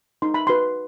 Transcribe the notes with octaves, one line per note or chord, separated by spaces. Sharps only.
D#4 C6
B5
F#4 B4 C6